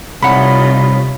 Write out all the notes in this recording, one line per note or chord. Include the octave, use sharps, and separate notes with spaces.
C2 C3 D#4 F4 C#5 F#5 B5